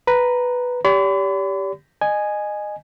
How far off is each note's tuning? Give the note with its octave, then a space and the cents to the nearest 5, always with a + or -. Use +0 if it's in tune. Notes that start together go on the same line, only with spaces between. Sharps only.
B4 +0 A#5 +0
G4 +0 D5 -45 B5 +40
D#5 -25 G#5 +0